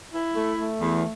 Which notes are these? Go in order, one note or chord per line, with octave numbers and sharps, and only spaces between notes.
E4
A3
A3
E2